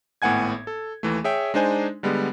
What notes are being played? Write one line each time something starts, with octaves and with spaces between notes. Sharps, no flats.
G#1 A2 B3 F#5 G#5 G#6
A4
D#2 E3 A3
G#4 C#5 E5 G5
G#3 D4 D#4 C5 G#5
D3 G3 G#3 B3